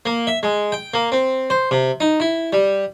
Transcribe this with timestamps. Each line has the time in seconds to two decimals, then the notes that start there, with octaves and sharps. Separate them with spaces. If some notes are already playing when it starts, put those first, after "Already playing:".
0.06 A#3
0.27 E5
0.43 G#3
0.72 G5
0.94 A#3
1.12 C4
1.50 C5
1.71 C3
2.00 D#4
2.20 E4
2.53 G3